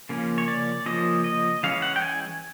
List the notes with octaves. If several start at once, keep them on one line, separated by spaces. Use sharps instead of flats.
C#3 F3 A#3 C#4
C#5
D5
C#3 F3 A#3 C#4 D#5
D#5
E3 G#3 C#4 F5
F#5
G5
G#5